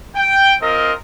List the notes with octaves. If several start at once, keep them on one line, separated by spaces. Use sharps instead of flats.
G5
C4 F4 A#4 D#5